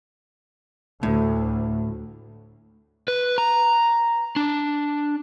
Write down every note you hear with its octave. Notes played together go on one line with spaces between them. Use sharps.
D2 A2
B4
A#5
D4